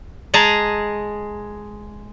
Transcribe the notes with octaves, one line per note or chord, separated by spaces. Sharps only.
G#3 G#4 A5 A#5